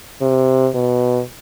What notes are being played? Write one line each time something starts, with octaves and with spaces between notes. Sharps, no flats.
C3
B2